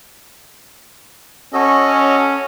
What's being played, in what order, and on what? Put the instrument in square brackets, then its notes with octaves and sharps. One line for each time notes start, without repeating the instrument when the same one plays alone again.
[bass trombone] C#4 [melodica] F#4 A4 D#5